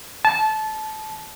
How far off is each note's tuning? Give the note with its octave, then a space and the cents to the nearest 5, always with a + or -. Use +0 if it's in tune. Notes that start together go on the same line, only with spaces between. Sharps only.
A5 -20